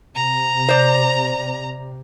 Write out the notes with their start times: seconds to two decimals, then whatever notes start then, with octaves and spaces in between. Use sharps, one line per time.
0.15 C3 A#5
0.69 C5 D5